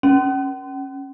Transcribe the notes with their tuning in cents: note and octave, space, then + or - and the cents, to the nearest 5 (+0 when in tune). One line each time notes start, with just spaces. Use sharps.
C#4 -10